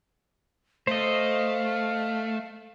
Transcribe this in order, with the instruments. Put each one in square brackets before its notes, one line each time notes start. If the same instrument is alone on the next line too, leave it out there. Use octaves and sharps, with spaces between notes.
[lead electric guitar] A3 [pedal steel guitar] C5 D#5 [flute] F5